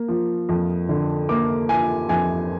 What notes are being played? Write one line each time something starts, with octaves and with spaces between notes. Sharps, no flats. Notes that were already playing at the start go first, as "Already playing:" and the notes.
Already playing: A#3
F3
F2
D3
A#3 D6
F3 G#5
F2 G#5